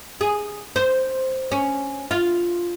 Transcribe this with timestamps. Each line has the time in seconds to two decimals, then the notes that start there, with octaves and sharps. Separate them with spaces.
0.21 G#4
0.76 C5
1.52 C#4
2.11 F4